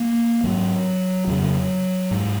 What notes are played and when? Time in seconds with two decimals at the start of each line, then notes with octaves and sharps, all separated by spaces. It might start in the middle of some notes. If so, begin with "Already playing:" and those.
Already playing: A#3
0.44 G#2 F#3
1.27 F2 C#3 F#3
2.11 G#2